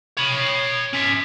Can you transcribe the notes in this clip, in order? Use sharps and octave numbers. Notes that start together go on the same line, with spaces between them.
C#5 B5
C#4 E5